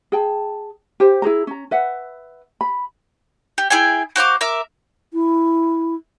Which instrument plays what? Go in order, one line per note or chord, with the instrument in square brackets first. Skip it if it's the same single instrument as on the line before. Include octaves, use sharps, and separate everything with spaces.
[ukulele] G#4 G5 A5
G4 C5
E4 G#4 C5 A#5
C#4 A#5
B4 E5 F#5
B5
[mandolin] G4
E4 G#4 G5 G#5
F#4 C5 F5 D6
A#4 E5 D6
[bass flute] E4